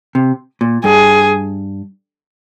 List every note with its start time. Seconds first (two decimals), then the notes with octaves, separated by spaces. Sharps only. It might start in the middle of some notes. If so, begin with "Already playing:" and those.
0.15 C3
0.61 A#2
0.84 G2 G#4